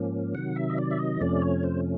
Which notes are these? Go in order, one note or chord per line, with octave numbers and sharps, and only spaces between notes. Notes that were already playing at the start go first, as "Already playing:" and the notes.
Already playing: G#2 F3 A#3 C#4
C3 D#3 F#3 F#5
E5
D#5
D5
E5
D#5
F2 C3 F3 A3 C#4 D5
C#5
C5